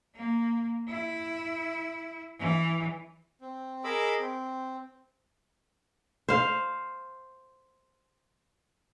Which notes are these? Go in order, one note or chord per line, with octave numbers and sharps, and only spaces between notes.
A#3
E4
E3
C4
G#4 A#4 D#5 B5 D6 E6
C4
C5 F5